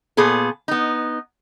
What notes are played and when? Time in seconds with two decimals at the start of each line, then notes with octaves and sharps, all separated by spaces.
0.17 A#2 B3 G#4 A4
0.68 B3 D#4